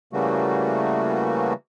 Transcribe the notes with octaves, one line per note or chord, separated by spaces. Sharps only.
C#3 E3 G3 A3 A#3 F#4